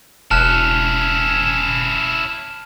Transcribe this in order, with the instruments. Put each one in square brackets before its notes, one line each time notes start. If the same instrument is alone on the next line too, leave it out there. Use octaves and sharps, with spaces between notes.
[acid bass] E1 [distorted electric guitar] C#4 E4 [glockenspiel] A5 F6 F#6